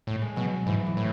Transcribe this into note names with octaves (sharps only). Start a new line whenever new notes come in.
A2
G#3
B2 F#3
G#2 E3
E3
A2